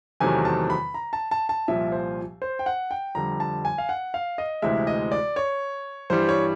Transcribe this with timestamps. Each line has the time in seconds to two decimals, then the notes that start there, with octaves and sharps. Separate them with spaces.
0.20 E2 C3 D#3 F#3 A3 G#5
0.45 A5
0.70 B5
0.94 A#5
1.13 A5
1.31 A5
1.49 A5
1.68 C2 A#2 F3 E5
1.92 C5
2.42 C5
2.59 G5
2.66 F#5
2.91 G5
3.15 F2 D3 G3 A#5
3.40 A5
3.65 G#5
3.78 F5
3.89 F#5
4.14 F5
4.38 D#5
4.62 D2 C3 E3 G#3 E5
4.87 D#5
5.12 D5
5.36 C#5
6.10 G2 E3 G3 C5
6.29 C#5